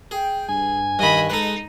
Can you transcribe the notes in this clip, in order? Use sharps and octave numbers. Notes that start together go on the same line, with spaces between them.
G#4 G5
G2 G#5
G2 D#3 D#5 B5
G#3 D#4 A4 B4